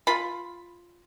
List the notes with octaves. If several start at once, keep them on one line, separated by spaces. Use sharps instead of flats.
F4 B5